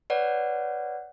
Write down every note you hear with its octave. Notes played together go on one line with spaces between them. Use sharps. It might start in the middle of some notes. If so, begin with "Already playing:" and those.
B4 C#5 D5 F#5